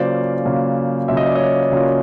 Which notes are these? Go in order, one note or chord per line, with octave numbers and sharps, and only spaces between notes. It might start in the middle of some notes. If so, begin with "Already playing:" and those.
Already playing: C#3 F#3 A#3 C#4 F4 C5 D5
C#3 F#3 A#3 C#4 F4
C#3 F#3 A#3 C#4 F4 E5
D#5
D5
C#5 D#5
C#3 F#3 A#3 C#4 F4